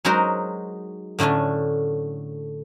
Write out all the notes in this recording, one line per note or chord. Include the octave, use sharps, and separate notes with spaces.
F#3 G#3 D#4 F#4 A#4 C5
A2 D3 A3 C#4 D4